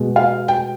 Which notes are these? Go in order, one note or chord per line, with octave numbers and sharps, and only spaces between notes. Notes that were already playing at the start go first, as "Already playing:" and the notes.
Already playing: B2 G#3
F5
G5